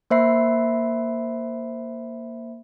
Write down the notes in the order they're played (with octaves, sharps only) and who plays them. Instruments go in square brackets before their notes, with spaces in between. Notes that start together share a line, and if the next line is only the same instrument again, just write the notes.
[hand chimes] A#3 C5 E5 B5 C7